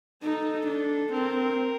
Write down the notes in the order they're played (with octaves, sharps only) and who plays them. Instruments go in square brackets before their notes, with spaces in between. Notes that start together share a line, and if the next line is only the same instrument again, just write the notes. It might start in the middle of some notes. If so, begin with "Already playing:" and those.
[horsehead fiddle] D#4 [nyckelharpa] A4
[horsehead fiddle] D4
[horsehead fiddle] C4 [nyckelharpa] A#4